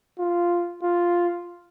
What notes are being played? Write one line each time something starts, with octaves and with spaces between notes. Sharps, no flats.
F4
F4